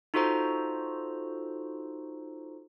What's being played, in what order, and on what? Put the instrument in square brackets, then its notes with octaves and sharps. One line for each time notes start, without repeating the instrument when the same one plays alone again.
[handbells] D#4 F4 F#4 A4 C5 A#5